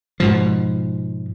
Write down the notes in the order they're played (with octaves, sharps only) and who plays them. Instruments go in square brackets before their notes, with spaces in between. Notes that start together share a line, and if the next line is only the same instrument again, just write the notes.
[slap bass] G#2 B2 F3